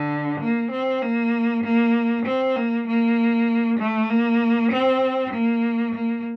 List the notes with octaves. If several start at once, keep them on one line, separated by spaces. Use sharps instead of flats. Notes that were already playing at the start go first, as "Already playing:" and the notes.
Already playing: D3
A#3
C4
A#3
A#3
C4
A#3
A#3
A3
A#3
C4
A#3
A#3